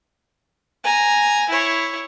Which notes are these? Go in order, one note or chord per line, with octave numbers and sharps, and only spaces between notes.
G#5 A#5
E4 C#5